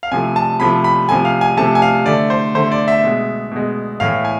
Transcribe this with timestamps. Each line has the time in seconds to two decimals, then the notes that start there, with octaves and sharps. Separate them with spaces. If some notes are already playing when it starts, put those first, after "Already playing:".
0.03 F5
0.12 C3 F3 A3 G#5
0.36 A5
0.60 C3 F3 A3 B5
0.84 B5
1.09 C3 F3 A3 G#5
1.25 F5
1.41 G#5
1.57 C3 F3 A3 A5
1.75 G#5
1.82 F5
2.06 D3 A3 D5
2.30 C5
2.55 D3 A3 C5
2.71 D5
2.88 E5
3.03 B2 G#3
3.51 B2 G#3
4.00 A2 E3 A3 F5
4.25 G#5